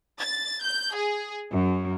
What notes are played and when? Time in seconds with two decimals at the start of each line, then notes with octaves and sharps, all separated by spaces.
0.20 A6
0.63 G6
0.94 G#4
1.52 F#2